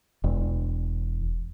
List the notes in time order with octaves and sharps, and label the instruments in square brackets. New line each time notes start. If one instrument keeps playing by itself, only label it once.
[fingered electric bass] E1